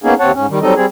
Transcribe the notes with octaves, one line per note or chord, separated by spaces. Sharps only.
A#3 B3 C#4 D#4 G#4
D#2 C4 C#5 F#5 A5
G#2 C#4
D#3 G3
F#3 G3 C4 D#4 A4 D#5
G3 C4 G#4